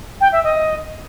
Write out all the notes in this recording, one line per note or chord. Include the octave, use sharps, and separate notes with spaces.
G5
E5
D#5